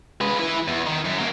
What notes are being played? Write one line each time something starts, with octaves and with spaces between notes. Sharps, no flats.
G#3 B4
E4 B4
E2
D#3
F#2
F#3 A#3